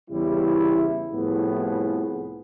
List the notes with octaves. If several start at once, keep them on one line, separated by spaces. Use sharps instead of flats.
E2 C#3 G3 E4
C2 A2 F3 B3 G#4